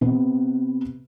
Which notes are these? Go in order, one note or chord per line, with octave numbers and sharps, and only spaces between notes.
C3 B3